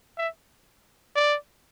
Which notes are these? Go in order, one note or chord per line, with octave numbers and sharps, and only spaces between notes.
E5
D5